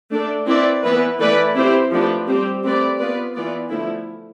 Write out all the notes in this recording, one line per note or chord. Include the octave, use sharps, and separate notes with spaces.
A3 D4 A4 D5
C4 E4 B4 D5
E3 B3 E4 B4
E3 A3 E4 B4 D5
C4 E4 G4 C5
F3 A3 D4 G4 B4
G3 C4 G4 C5
A3 C4 G4 B4 D5
B3 F4 B4 D5
E3 B3 F4 B4 D5
D3 F3 A3 E4